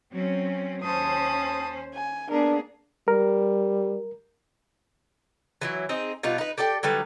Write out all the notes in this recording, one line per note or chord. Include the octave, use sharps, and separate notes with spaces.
F#3 C4 C#4
D#2 C#4 C5 A5 D#6
G#5
A#3 B3 D4 G#4 A#4
G3 A#4
E3 F#3 E4
C4 D#4 G#4
B2 G3 D#4 F4
D#4 B4
G4 A4 D5 G5
D3 F#3 G3 B4